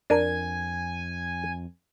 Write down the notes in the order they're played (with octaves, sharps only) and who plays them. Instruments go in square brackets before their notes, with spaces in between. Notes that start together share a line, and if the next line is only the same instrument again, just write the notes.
[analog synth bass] F2 [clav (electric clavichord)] D4 A#4 [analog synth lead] G#5